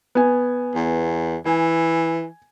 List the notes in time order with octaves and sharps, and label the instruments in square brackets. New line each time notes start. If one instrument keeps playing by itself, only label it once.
[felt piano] B3 G#5
[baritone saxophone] E2
[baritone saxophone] E3 [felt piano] G#5